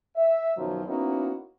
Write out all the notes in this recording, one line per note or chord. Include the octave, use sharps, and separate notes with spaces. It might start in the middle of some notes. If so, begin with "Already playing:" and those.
E5
F#2 B2 D#3 F3 F#3
A#3 B3 C#4 D#4 E4 F#4